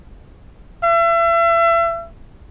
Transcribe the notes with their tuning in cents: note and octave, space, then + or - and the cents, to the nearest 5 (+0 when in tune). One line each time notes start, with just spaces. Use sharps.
E5 +35